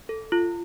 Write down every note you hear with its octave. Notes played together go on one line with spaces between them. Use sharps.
A4
F4